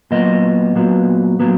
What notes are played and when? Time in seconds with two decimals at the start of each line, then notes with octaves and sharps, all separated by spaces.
0.11 A#2 F#3 B3 D#5
0.75 A#2 F#3 B3
1.40 A#2 F#3 B3